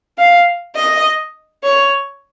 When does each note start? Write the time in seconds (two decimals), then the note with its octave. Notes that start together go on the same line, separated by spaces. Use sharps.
0.18 F5
0.76 D#5
1.63 C#5